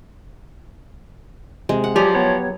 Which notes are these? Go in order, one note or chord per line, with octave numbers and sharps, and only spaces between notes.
C3 G#3
F#5
F3 F#3 G4 G#4 D5 G#5 A#5
B3 G4 B4 C#5